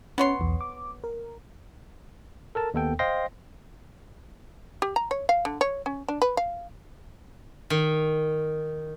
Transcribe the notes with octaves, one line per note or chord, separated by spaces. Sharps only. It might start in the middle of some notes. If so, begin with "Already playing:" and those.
B3 C#4 C#5 C6
B1 E2
D6
A#4
A4 A#4 A5
D#2 B3 A4 G5
C5 D#5 F5 G5 C6 A#6
G4
A#5
C#5
F5
D3
C#5
C#4
D4
B4
F5
D#3